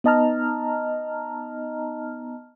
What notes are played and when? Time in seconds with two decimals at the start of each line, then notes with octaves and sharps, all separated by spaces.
0.04 B3 D#4 D#5 A5 A#5 F6